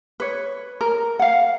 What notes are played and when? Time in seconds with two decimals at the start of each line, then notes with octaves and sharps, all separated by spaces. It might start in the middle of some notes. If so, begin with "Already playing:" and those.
0.20 B4 C#5
0.81 A#4
1.19 F5 F#5